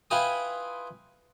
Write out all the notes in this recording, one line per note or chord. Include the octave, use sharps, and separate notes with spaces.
E4 F4 B4 G5 G#5 D#6